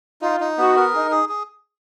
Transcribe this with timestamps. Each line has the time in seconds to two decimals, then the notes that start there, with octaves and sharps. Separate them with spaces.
0.22 D#4 F4
0.40 D#4
0.58 B3 F#4
0.76 A#4
0.93 D#4 G#4
1.11 G#4
1.29 G#4